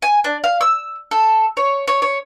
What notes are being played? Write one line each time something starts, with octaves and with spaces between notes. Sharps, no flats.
G#5
D4
F5
E6
A4
C#5
C#5
C#5